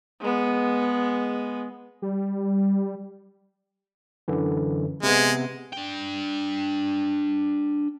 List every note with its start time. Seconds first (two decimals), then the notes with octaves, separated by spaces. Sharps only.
0.20 G#3 B3
2.02 G3
4.28 F#2 D3 E3
5.03 C3 G#3 B3
5.73 D4 G5